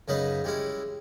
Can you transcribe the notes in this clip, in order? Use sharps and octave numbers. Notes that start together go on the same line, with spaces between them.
F#2 C#3 C#4 D#4 B4 B5
G3 G#3 C#4 E4